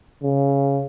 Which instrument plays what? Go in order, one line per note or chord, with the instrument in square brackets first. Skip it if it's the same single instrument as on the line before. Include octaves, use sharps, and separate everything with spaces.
[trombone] C#3